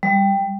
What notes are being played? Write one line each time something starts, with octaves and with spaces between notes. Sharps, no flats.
G3